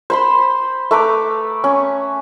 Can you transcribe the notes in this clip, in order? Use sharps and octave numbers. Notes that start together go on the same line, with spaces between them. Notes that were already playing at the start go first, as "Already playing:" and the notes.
C5 B5 C6
A3 B4 A#5 D6
C#4